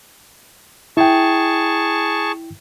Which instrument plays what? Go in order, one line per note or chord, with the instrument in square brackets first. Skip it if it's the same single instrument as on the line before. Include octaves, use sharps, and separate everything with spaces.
[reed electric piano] E4 G5 [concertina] G#4 A5 C#6